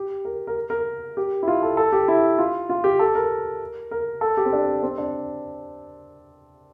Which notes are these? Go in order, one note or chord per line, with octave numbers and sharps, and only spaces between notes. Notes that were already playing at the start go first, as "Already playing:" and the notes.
Already playing: G4
A#4
A#4
A#4
G4
E4
F4
A4
A4
G4
E4
F4
F4
G4
A4
A#4
A#4
A4
G4
C4
D4
C4
D4